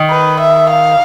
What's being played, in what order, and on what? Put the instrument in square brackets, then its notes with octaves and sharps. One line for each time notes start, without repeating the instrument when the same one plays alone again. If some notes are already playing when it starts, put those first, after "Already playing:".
Already playing: [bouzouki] D#3
[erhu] B4
E5
F5